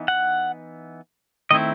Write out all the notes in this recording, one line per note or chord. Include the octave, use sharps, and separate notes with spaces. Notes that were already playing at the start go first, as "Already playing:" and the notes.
Already playing: E3 B3 D#4
F#5
D#3 A3 C4 E4 D#5